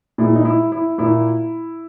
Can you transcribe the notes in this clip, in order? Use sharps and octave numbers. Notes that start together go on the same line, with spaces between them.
A#2 G#3 E4
D#4
E4
E4
A#2 A#3 E4